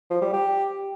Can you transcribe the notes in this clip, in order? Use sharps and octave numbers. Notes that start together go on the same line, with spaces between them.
F3
G3
G4